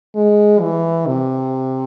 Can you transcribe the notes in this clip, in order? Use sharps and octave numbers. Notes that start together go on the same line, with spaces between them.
G#3
E3
C3